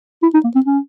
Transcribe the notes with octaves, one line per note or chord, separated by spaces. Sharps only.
E4
D#4
A#3
C4
C#4